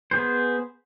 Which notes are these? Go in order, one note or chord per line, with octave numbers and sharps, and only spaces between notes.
B3 G#4 C5